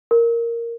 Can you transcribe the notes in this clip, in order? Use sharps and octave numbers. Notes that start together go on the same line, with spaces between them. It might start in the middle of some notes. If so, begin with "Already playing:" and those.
A#4